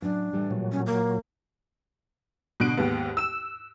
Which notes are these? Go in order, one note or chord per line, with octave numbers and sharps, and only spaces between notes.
A2 F#3 C#4 D4
A2 E3 G3
A#2 F#3
C#4
A#3
B2 D3 F#6 D7
D#2 G#2 B3
E6 E7